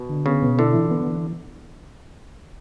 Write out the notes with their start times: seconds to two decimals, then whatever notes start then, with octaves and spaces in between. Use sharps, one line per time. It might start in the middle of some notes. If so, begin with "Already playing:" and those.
Already playing: B2
0.09 D3
0.26 C#3 B3
0.42 B2
0.59 D3 E4
0.74 E3
0.91 B3
1.07 E3